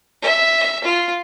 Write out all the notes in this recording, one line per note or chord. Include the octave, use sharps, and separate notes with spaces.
E5
F4